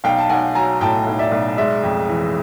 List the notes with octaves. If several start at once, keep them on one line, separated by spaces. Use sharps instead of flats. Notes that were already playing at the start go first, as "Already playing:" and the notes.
B1 F5 G5
A5
B1 F#5 G#5
F#3 G#5 A#5
A2 G5 A5
B1
D5 E5
B1
G#3 D5 E5
F2
E3